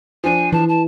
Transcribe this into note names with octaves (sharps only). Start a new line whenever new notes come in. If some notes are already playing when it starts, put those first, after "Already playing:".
F3 D4 G#5
E3 A5
A5